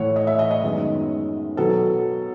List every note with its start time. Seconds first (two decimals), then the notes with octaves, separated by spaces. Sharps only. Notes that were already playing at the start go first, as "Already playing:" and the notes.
Already playing: A2 E3 A3 C#5 F#5
0.16 D#5
0.27 E5
0.39 D#5
0.51 D#5
0.62 F#2 D#3 G#3 B3
1.57 B2 F#3 B3 A4